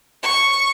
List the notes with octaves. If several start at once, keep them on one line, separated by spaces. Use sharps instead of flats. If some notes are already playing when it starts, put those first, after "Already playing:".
C#6